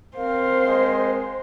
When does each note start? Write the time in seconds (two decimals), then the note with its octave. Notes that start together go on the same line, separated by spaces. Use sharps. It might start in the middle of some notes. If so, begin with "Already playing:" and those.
0.17 C4 A#4 C5 F5
0.66 G#3